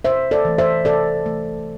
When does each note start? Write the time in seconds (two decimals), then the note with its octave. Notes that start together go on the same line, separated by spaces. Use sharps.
0.05 C3 C5 E5
0.31 A4 D5
0.45 E3 A3
0.58 C5 E5
0.85 C3 A4 D5
1.25 E3 A3